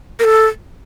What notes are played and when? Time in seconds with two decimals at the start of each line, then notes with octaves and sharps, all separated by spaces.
0.19 A#4
0.24 A4